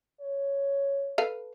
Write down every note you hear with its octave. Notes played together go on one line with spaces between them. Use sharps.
C#5
A4 B4 F5